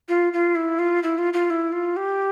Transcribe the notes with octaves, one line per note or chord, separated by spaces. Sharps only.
F4
F4
E4
F4
E4
F4
F4
E4
F4
G4